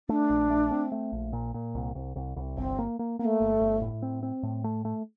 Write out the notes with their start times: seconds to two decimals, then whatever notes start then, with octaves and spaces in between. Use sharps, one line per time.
0.09 A3 D4
0.30 A#1
0.50 A3
0.71 C4
0.92 A3
1.12 A#1
1.33 A#2
1.54 A#2
1.75 C2
1.95 C2
2.16 C2
2.36 C2
2.57 G1 C4
2.79 A#3
2.99 A#3
3.19 A#3 C4
3.24 A3
3.40 G1
3.60 G1
3.81 A2
4.02 C4
4.23 C4
4.43 A2
4.64 A3
4.85 A3